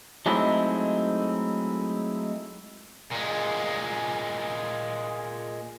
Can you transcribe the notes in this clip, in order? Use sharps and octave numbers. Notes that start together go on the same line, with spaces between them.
F#3 G#3 A3 C4 D#4 E4
A#2 G#3